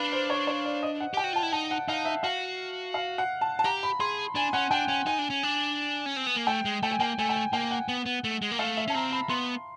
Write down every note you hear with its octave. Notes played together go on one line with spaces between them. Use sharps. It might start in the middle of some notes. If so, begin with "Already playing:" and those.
Already playing: D4 B4 F5
C5
C#5
C#5
D5
D#5
F#5
G4 G5
F#4
F4 A5
E4
D#4 A5
F#5
D#4 F5
E5
F#4 F5
F5
F#5
A5
A5
G4 A#5
B5
G#4 C6
D4 G#5
C#4 F#5
D4 G5
C#4 G#5
D#4 G#5
D4
C#4
D4
C#4
C4
B3
A#3
A3 G5
G#3
A3 G5
G#5
A#3 G5
A3 G#5
G5
G#5
A#3 G5
F#5
B3
B3
A3
G#3
A#3
A3 F5
E5
C#4 A5
C4 A#5
B5
B3 C6